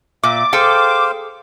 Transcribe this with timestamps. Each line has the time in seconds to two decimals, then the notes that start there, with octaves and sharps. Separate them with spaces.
0.23 A#2 E5 D6
0.53 G#4 A4 C5 F5 G5